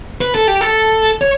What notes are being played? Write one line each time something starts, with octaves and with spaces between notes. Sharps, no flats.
B4
A4
G4
A4
C#5